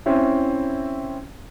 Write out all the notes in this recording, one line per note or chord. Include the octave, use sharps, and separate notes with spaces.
C4 C#4 E4